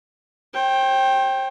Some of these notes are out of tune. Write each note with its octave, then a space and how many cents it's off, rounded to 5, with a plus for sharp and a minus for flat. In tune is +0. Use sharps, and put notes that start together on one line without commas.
C5 +40 G5 +0